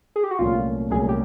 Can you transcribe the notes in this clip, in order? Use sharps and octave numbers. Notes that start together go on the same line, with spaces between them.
G#4
G4
F#4
C2 A#2 F#3 A3 C#4 F4
C2 A#2 F#3 A3 C#4 G#4
G4